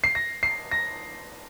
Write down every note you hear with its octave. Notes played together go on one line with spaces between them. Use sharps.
C7
A#6
C7
A#6